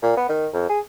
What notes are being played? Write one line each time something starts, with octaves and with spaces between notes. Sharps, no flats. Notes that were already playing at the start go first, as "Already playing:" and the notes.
A#2
B3
D#3
F2
G#4